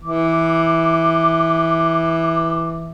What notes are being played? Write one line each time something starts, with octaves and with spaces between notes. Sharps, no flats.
E3 D6